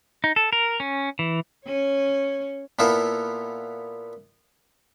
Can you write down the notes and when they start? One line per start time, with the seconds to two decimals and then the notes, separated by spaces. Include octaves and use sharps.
0.24 D#4
0.36 A4
0.53 A#4
0.80 C#4
1.19 E3
1.65 C#4 C#5
2.79 A#2 B3 E4 F4 A4